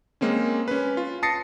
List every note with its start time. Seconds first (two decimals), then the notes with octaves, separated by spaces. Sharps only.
0.21 G#3 A#3 C4 C#4
0.68 C#4 B4
0.97 F4
1.23 A5 D#6 A6 A#6 C7 C#7